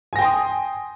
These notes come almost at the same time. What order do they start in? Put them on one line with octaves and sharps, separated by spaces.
G#5 A#6 G5 C6 D#6